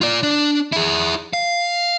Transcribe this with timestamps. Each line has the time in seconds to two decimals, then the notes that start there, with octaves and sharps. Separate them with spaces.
0.01 F4 D5
0.23 D4
0.72 E4 G#4
1.33 F5